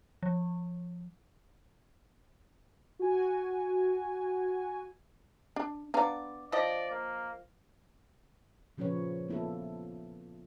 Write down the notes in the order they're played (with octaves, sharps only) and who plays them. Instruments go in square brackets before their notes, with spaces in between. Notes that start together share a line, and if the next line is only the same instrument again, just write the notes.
[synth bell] F3
[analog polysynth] F#4 G#5
[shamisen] D4
[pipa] B3 D5 [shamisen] D4 F5 A#5
[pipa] F3 D#5 [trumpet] D5
[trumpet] A#3
[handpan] A#2 C#3 F3 C#4 B4 C#5
A#3 B3 E4 F4 A4